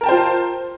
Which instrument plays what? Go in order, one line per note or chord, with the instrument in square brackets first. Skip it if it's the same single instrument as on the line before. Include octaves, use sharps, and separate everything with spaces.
[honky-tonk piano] A#4
A5
G5
C5
F4